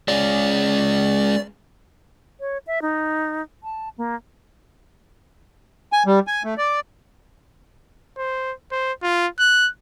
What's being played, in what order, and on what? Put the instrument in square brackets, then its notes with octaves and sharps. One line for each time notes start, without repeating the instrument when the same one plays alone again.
[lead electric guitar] G#3 C#4 [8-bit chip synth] D5
[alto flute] C#5
E5
D#4
A5
A#3
[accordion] G#5
G3
G#5
A3
D5
[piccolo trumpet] C5
C5
F4
F#6